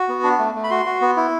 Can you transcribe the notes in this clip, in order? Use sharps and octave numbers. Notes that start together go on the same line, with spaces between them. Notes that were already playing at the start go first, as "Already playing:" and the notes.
Already playing: F#4
B3
D4
A3
A3
B5
F#4 C6
F#4
B3
E4